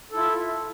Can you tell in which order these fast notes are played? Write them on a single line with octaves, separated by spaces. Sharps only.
A4 E4 F4 E5